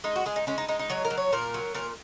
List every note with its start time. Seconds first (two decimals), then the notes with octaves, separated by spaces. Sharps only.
0.04 G#3 D#4
0.16 F#4
0.26 G#3 G#4
0.36 D#4
0.47 G#3 C#4
0.58 D#4
0.68 G#3 D#4
0.79 D#4
0.90 F#3 C#5
1.05 A#4
1.10 F#3
1.18 C#5
1.33 A#2 A#4
1.54 F#3
1.75 A#2 A#4